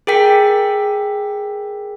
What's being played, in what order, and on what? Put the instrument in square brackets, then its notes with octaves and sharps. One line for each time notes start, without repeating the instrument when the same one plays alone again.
[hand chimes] G#4 A#4 G5 B6